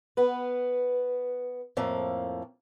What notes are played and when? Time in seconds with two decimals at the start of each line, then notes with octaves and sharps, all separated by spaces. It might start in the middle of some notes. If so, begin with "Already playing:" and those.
0.17 B3 B4
1.77 F2 A2 F3 A#3